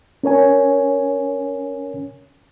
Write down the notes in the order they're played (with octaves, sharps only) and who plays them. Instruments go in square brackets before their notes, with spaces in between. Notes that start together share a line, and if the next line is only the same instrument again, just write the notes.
[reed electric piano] C#4 A#4 C#5 G#5